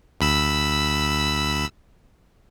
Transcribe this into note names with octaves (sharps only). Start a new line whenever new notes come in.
D2 B5 E6